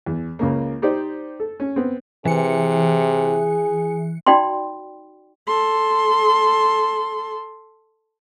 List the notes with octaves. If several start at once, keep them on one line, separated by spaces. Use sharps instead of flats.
E2
C#2 C#3 A#3
D#4 G4 C5 D5
A4
C#4
B3 C4
C3 E3 G#4 C#7
D#4 F#4 D5 G5 B5 C6
A4 C6